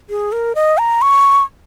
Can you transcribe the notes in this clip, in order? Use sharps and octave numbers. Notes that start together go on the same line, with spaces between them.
G#4
A#4
D#5
A#5
C#6